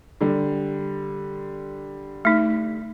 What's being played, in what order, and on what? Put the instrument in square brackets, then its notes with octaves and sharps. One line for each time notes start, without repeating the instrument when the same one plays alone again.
[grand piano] D3 G3
[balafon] A3 D#4